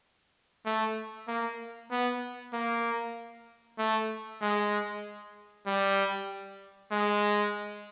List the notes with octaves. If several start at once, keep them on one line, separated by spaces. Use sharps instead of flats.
A3
A#3
B3
A#3
A3
G#3
G3
G#3